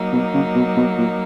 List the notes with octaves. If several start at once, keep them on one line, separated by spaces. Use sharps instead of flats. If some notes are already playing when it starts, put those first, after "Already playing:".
Already playing: F#3 A#3 D#4
B2
C#3
B2
B2
A#2